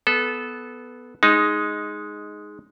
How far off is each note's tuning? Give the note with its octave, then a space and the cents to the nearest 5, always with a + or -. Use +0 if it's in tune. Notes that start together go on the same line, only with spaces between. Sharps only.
B3 +0 A4 -20
G#3 +5 D#4 +0